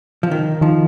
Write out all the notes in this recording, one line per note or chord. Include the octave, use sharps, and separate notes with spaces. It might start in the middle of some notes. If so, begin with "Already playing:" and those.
F3
D#3
D#3 F3